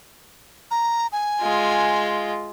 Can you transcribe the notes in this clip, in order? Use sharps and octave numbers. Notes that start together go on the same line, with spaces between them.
A#5
G#5
G#3 F4